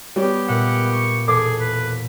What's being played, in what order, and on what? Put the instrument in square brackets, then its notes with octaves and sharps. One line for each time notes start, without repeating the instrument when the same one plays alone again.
[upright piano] G3 C#5 [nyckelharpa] B3 G4
[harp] A#2 G#3 E5 [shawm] F#5
[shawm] C#6
[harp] E1 [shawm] G#4 [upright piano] A4 D6
[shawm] B4